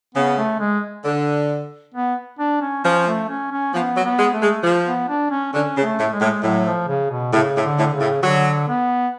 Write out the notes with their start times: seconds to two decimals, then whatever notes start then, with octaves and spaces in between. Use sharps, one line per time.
0.15 C#3 B3
0.38 A3
0.60 G#3
1.05 D3
1.94 B3
2.39 D4
2.61 C#4
2.84 F3 C#4
3.07 A3
3.29 C#4
3.52 C#4
3.74 F3 B3
3.96 F#3
4.04 B3
4.18 G#3
4.34 A3
4.41 G#3
4.64 F3
4.86 B3
5.09 D4
5.31 C#4
5.53 D3 C#4
5.76 C#3
5.83 A3
5.98 A2
6.13 G#3
6.21 A2
6.43 A2 F#3
6.65 F3
6.88 C#3
7.10 B2
7.33 A2 C#3
7.56 A2
7.63 D3
7.78 A2
7.93 C#3
8.00 A2
8.23 D3 F#3
8.68 B3